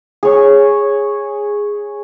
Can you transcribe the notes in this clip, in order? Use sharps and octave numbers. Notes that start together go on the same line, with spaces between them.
G#4 C#5